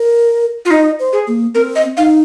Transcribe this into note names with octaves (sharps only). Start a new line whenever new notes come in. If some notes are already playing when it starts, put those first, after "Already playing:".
Already playing: A#4
F4
D#4 D#5
C5
G#4
A#3
C4 A#4
D#5
D#4 F5